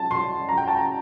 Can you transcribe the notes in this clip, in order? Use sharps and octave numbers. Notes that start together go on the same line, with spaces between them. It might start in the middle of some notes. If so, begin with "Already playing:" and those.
Already playing: A5
C6
A#5
G5
A5
A#5